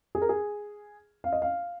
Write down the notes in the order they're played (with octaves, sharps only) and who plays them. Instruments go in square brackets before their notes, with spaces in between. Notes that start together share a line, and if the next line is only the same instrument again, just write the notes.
[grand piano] G#4
A#4
G#4
F5
D#5
F5